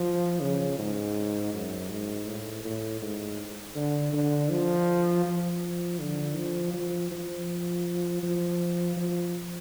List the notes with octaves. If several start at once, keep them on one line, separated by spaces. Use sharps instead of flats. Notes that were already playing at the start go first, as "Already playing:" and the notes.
Already playing: F3
C#3
G#2
F#2
G#2
A2
A2
G#2
D3
D3
F3
F3
D3
F3
F3
F3
F3
F3